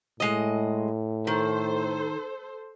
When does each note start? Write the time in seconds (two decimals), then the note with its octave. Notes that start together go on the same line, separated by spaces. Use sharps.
0.20 A2 G#3 D#5
1.27 D#3 A4 C5